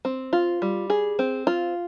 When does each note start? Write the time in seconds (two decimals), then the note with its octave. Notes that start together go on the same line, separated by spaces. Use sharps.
0.05 C4
0.33 F4
0.62 G3
0.90 G#4
1.19 C4
1.47 F4